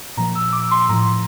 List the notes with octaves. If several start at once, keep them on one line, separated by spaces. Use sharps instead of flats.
A#2 F3 A#5
E6
D6
C6
A2 F3 A#5